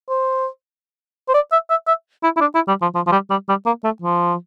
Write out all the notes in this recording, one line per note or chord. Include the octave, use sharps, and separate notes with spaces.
C5
C5
D5
E5
E5
E5
E4
E4
D4
E4
G3
F3
F3
F3
G3
G3
G3
A#3
A3
F3